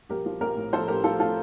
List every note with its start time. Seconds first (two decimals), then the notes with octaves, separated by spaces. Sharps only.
0.09 A#1 G4 A#4
0.26 F3
0.41 A#1 G4 A#4
0.57 A2
0.73 F3 A4 C5
0.88 A2 G4 A#4
1.04 F3 F4 A4
1.19 A2 F4 A4